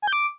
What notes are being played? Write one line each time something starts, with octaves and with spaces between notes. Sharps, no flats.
G#5
G6
D6